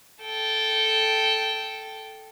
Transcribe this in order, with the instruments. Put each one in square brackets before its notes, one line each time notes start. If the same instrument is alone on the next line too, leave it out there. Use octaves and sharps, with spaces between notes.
[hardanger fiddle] A4 G5